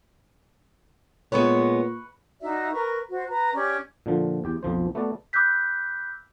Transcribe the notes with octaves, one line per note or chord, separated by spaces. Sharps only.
A#2 G#3 B3 B4 C#5 C#6
D#4 F#4 D5 E5
A#4 B4 A#5 C#6
F#4 C5
B4 A#5
C#4 G4 D5 C#6
A#2 D3 F3
E2 G4 G5
B1 F2 F3 C5
A3 B3 F#4 D5 A5
B5 D6 E6 F#6 G6 B6